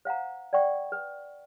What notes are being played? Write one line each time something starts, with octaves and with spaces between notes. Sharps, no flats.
C5 F5 F#5 A#5
D5 F#5 G5 C#6
B4